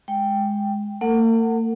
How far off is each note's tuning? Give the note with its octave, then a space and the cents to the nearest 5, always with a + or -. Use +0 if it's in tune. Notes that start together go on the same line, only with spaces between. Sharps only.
G#3 +0 G5 +0
A#3 -45 A#4 -45 F#5 +0